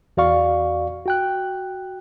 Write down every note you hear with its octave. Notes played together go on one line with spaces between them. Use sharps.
E2 F#4 D5 F5 C#6
F#4 G5 F#6